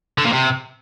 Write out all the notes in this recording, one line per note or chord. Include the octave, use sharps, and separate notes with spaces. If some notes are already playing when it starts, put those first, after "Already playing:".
D3
A#2
C3